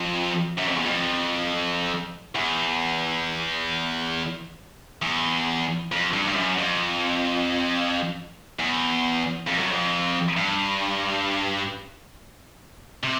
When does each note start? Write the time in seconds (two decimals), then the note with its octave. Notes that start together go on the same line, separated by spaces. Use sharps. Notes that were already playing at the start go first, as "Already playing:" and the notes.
Already playing: F2
0.57 F#2
0.67 F2
0.75 E2
0.85 F2
2.35 E2
5.02 E2
5.92 F2
6.13 G2
6.28 G2
6.36 F#2
6.59 F2
8.59 E2
9.48 F2
9.59 F#2
9.71 F2
10.37 G2
13.03 C3